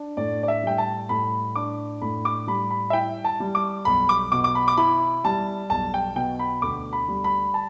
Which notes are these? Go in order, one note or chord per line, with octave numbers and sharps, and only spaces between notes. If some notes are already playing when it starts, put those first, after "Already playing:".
Already playing: D4
A2 D5
D5
E5
G3 G5
A5
A2 B5
D4 D6
A2 B5
D6
G3 B5
B5
E5
E4 G5
A5
G3
D6
B1 B5
D6
B2 D6
D6
B5
D6
E4 B5
G3 A5
B1 A5
G5
B2 G5
B5
D2 D6
B5
G3
B5
A5